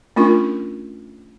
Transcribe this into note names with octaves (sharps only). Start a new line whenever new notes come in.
A3 C#4 D4 F4 A#4 C#6